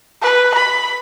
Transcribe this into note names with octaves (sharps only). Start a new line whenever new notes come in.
B4
B5